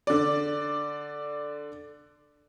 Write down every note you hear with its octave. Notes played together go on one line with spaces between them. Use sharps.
D3 D5